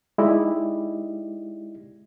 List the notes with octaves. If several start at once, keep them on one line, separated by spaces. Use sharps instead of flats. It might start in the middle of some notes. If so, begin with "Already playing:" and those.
G#3 D#4 E4 G4 D5 D#5